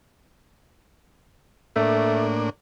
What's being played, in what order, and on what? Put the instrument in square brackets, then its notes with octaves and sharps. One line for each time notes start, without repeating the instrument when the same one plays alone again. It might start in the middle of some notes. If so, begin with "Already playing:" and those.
[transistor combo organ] A2 A#3 D4 [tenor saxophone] A3